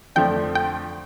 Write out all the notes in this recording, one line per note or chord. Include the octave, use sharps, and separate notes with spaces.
F2 D3 F3 A3 D4 G5
G5